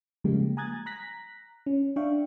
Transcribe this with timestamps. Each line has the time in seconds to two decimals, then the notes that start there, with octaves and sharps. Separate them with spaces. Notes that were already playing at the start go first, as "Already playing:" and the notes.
0.24 C#3 F3 G3 G#3 A#3 G4
0.57 G#5 A#5 D#6 F#6 G#6 A6
0.86 A#5 F#6 A#6 B6
1.66 C#4
1.96 D4 E5 F5 G5 C#6